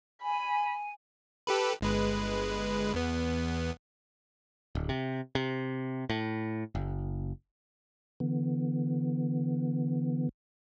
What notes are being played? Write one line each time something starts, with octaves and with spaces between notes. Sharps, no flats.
G#5 B5
G4 A4 B4
G1 G#3 B4
E2 B3
D1
C3
C3
A2
F#1
D3 E3 B3